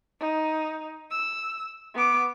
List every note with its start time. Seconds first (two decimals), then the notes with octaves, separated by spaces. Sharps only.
0.20 D#4
1.11 E6
1.95 B3 D6